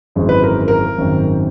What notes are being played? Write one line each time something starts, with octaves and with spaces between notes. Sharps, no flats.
G#1 F#2 E3 G#3
B4
A#4
A#4
G#1 F#2 D#3